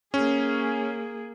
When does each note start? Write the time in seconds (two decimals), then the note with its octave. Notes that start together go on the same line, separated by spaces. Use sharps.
0.14 A#3 C#4 G#4